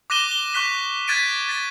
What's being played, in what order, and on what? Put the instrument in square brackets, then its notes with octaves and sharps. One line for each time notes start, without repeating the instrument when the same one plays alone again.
[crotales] D6 F#6 A#6 D#7 E7 G7
G7
C#6 F#6 B6 G7
F#6 G#6 A6 B6 D7 D#7
A6 B6